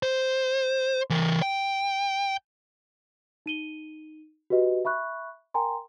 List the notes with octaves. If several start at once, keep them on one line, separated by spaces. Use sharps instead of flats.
C5
E3 A#4
G5
D#4 D#7 G7
F#4 G4 B4 D#5
E5 B5 C#6 F#6
A#4 G5 G#5 A#5 C6